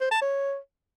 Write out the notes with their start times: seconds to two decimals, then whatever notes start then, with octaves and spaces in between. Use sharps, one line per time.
0.01 C5
0.11 A5
0.21 C#5